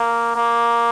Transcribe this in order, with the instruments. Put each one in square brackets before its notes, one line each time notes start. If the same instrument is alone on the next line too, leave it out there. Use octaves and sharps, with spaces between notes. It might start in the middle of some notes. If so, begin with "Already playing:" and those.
Already playing: [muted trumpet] A#3
A#3